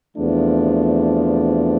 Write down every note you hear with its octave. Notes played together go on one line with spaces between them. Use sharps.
E2 C3 F3 A3 D4